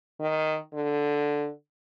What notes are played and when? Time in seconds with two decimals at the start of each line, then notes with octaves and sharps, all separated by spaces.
0.20 D#3
0.74 D3